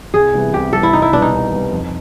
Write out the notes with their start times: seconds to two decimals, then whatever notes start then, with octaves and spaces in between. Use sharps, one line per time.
0.14 C2 G#4
0.34 C3 E3 G3 B3
0.53 C2 G4
0.73 C3 E3 G3 B3 A4
0.83 E4
0.93 C2 D#4
1.02 E4
1.12 B2 G3 D4
1.22 D#4
1.32 C2
1.52 B2 G3
1.72 F2